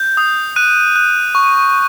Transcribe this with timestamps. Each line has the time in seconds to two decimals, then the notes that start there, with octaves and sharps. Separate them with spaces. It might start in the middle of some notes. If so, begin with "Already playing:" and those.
Already playing: G6
0.17 D#6
0.56 F#6 D#7
0.96 F#6
1.35 C#6